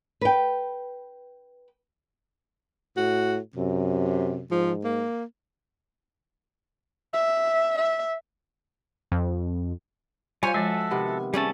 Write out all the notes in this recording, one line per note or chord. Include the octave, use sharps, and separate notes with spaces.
B4 G5
A2 F#4
F#2 C3
G#2 F3
A#3
E5
E5
F2
G3 F4 C5 C#5 F5 G#5
F3 G#3 F#4 A4 E5
C3 D#3 B3
G3 A3 C#4 G#4 A5